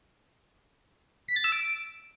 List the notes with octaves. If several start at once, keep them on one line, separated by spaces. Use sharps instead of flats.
B6
A6
E6
D7